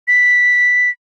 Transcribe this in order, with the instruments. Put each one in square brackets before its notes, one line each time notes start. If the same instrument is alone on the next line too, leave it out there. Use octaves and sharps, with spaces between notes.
[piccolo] B6